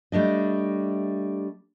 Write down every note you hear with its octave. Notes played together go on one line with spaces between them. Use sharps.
G3 A3 D4 D#5